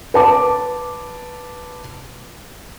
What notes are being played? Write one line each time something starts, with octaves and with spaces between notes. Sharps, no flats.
B4 A5 D6